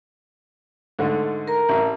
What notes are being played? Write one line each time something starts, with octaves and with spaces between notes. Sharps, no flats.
G#2 D3 A3
A#4 A#5
A1